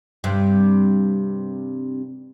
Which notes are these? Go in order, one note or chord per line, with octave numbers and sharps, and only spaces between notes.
G2 C3